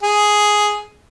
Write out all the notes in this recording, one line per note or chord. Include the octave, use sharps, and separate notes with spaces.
G#4